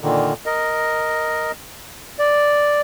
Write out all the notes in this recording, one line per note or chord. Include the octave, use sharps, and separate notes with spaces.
A#2 D3 D#3
A#4 D#5
D5